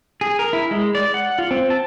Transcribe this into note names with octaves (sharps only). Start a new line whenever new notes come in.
G#4
A#4
E4
G#3
D5
F#5
F4
C4
A5